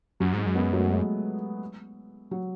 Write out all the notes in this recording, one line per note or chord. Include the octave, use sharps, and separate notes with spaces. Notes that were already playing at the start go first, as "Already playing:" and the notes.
F#2 F#3
G#2 G#3
F#2
G#3 B3
F#3 A3
G#3
F#3